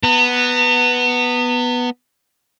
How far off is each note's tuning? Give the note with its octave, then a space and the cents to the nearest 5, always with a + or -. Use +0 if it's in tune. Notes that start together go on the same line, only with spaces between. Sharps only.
B3 +0 A#5 -45